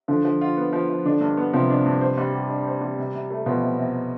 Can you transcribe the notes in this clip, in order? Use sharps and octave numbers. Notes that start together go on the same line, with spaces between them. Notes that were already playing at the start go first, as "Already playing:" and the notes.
D3 F3
F3
F4
B3
F3
F3
D3 D4
G2
B3
C3 F3
D4
G2
C5
G3
G4
D4
C5
G3
C3
C3
A3
B2 F3
C3
C3